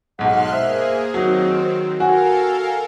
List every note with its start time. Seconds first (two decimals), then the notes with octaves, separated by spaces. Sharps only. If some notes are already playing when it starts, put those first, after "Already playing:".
0.19 B1 G#2 F#5 C6 F6 F#6
0.53 A#3 G#4 C5 E5
1.14 D#3 F#3 C4 D#4
2.00 F#4 A4 A#4 F5 G#5